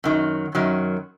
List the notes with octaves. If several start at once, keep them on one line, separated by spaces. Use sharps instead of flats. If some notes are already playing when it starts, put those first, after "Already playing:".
F#2 D#3 F#3
F#2 D#3 F#3